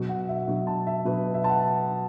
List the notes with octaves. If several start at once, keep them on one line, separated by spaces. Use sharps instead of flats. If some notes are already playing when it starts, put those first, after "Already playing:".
Already playing: B2 F#3
F#5
E5
B2 F#3
A5
E5
B2 F#3 B4
E5
A5
F#5